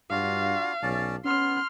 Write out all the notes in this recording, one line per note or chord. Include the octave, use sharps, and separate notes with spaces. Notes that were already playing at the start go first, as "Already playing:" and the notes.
G2 D4 F4 F#4 F5
B1 C#4 D5 A5
B3 C#4 C6 F6